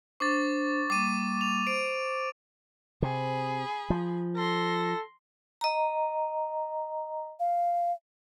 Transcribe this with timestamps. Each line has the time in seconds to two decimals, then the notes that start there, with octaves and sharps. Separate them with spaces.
0.20 D4 C5 C#6 D6 A6
0.90 G3 A#3 D6 D#7
1.41 F7
1.67 C5 D7
3.02 C3 G#4 B5
3.90 F3
4.37 A4 C6 A#6
5.61 D#5 A#5
7.40 F5